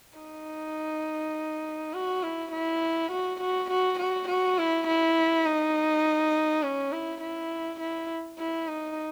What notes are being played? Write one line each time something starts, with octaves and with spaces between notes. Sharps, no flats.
D#4
F#4
E4
E4
F#4
F#4
F#4
F#4
F#4
E4
E4
D#4
C#4
E4
E4
E4
E4
D#4